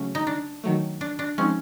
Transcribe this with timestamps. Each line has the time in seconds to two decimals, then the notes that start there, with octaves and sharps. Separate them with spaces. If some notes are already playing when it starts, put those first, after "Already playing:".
Already playing: C#3 F#3 A3 C#4
0.15 D#4
0.27 D4
0.64 D#3 F#3 A3
1.01 D4
1.19 D4
1.38 F3 G#3 C4 C#4 D#4